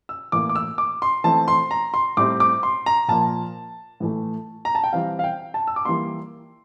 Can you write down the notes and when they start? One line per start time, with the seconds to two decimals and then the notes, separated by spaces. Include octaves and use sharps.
0.09 E6
0.32 A2 E3 A#3 D6
0.49 D6
0.56 E6
0.78 D6
1.02 C6
1.24 E3 A3 C4 A5
1.48 C6
1.71 A#5
1.94 C6
2.17 A2 G3 C4 D6
2.40 D6
2.63 C6
2.86 A#5
3.08 A#2 F3 A#3 A5
4.00 A2 E3 A3
4.65 A#5
4.75 A5
4.84 G5
4.93 E3 G3 C4 F5
5.19 F5
5.24 G5
5.54 A5
5.67 E6
5.76 D6
5.85 E3 G3 A#3 C6